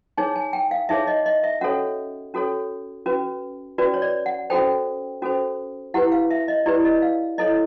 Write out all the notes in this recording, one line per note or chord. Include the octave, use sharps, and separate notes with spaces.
D#4 G#4 C#5 G#5
G#5
G5
F5
D#4 G#4 C#5 E5
D#5
D#5
E5
C#4 F#4 A4 C#5 F#5
C#4 F#4 A4 C#5
C#4 F#4 B4
C#4 F#4 B4 D5
C#5
D5
F#5
C#4 F#4 A4 C5 G5
C#4 F#4 A4 C5
E4 G4 B4 F#5
F5
E5
D#5
E4 G4 B4 D5
D#5
F5
E4 A4 C#5 D#5